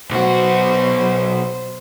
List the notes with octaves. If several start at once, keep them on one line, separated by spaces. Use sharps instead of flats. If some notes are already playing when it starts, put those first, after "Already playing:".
B1 B2 F#3 F#4 C5